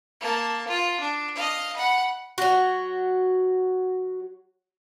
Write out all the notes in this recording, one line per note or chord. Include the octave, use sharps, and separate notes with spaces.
A#3 A5
F4
D4
D#5 F5
F#5 B5
F#3 F#4